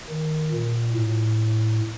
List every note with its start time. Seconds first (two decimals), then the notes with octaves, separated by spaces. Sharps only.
0.10 D#3
0.52 A#2
0.94 A2